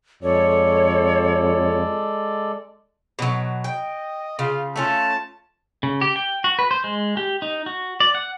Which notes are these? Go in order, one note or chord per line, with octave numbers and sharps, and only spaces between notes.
F2 G#3 A4 C#5 D5
B2 F#3
D#5 G5
C#3 F4
A3 C#4 F4 A5
C#3
G4
G5
F#4
B4
C5
G#3
G4
D#4
F#4
D5
F#5